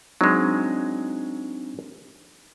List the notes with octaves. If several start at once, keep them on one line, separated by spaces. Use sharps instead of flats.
F#3 G#3 C4 D4 D#4